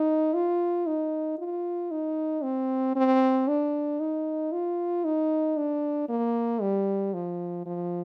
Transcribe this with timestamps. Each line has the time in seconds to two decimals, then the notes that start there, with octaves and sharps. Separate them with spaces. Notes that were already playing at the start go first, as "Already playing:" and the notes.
Already playing: D#4
0.34 F4
0.87 D#4
1.39 F4
1.91 D#4
2.43 C4
2.96 C4
3.48 D4
4.00 D#4
4.52 F4
5.05 D#4
5.57 D4
6.09 A#3
6.61 G3
7.14 F3
7.66 F3